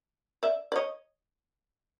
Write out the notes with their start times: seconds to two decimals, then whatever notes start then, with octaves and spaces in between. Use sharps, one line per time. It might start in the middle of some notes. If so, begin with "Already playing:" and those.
0.43 D5 E5
0.72 D5
0.76 C#5 D#5